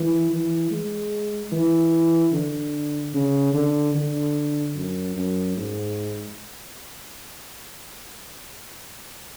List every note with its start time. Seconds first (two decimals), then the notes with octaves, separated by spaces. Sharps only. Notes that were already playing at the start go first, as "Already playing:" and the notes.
Already playing: E3
0.30 E3
0.71 G#3
1.52 E3
2.32 D3
3.14 C#3
3.54 D3
3.95 D3
4.75 F#2
5.16 F#2
5.57 G#2